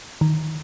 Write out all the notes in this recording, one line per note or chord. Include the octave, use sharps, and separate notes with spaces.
D#3